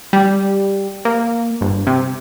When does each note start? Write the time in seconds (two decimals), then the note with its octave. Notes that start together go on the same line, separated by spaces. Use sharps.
0.13 G3
1.05 A#3
1.61 G1
1.87 C3